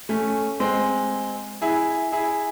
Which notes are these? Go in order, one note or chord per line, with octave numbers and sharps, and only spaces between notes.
A3 C#4
G#3 C4
E4 G#4
E4 G#4